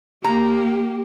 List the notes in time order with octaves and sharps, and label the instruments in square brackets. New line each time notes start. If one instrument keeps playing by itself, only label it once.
[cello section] A#3 [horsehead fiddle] G4 [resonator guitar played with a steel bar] A#5